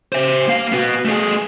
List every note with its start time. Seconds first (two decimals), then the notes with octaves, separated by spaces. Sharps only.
0.12 C5 E5
0.48 A#3 F5
0.72 B3 F#4
1.05 A3 G#4